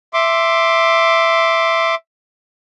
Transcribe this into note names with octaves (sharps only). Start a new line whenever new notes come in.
E5 C6 D6